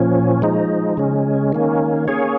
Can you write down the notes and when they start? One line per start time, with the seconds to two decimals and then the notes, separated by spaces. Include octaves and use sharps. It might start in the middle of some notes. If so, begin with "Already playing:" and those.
Already playing: A#2 F3 C#4
0.42 F3 G#3 D#4
0.97 C#3 G#3 C#4
1.52 D#3 A#3 C#4
2.08 A#3 C#4 G#4 C#5